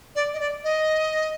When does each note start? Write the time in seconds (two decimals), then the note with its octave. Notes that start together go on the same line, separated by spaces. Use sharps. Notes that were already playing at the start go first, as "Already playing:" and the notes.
0.16 D5
0.34 D#5
0.40 D5
0.64 D#5